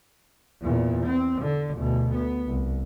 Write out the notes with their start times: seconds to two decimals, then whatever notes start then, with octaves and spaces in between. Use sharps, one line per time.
0.62 E2 A#2
1.06 C4
1.42 D3
1.77 D2 B2
2.15 B3
2.47 C2